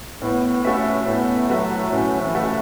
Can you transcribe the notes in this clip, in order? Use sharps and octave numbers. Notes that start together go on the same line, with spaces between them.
A2 B3
A3 C#4 F#4 B4 E5
A2 B3
F#3 A3 F#4 B4 E5
A2 C#4
E3
A3 F#4 B4 E5